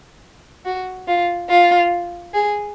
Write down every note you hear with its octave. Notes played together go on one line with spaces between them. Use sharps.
F#4
F4
F4
G#4